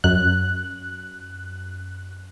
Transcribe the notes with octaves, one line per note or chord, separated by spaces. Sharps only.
F#2 F#6